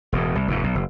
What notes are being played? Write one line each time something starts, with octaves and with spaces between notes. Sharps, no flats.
E1 E2 A2
C2
F1 D#2 G#2
B1
F#1